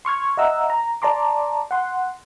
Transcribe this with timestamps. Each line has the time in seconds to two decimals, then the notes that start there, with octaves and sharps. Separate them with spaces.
0.05 C6 C#6 F6 G#6
0.37 D#5 E5 F#5 A#5 E6
0.70 A#5
1.02 D5 A5 A#5 C6 D6
1.71 F#5 C6